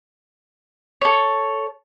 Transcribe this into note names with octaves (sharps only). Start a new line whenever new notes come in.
A4 C#5